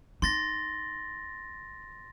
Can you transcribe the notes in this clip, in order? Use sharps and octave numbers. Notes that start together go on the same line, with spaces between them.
D#4 C6 A6 A#6